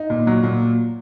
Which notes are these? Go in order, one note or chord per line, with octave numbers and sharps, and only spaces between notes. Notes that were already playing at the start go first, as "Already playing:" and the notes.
Already playing: D#4
A#2
F#3
A#2